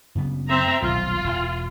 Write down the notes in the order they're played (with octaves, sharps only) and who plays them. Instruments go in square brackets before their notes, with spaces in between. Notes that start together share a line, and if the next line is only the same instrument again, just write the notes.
[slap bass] F#2 C#3 B3
[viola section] C4 E5 A#5
[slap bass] D#1 B1 [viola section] F4
[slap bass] E1